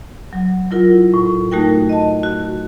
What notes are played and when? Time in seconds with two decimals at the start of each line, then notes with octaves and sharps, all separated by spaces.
0.33 F#3
0.71 F#3 E4 F4 A#4
1.14 A2
1.52 A3 D#4 F#4 A#4 G5
1.89 D#5 A5
2.23 F#4